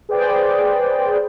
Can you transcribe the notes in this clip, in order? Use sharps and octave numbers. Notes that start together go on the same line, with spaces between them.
G#4 B4 C5 D5 G5